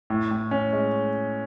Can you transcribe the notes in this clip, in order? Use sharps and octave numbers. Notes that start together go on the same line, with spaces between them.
A2
A2
C#4
G#3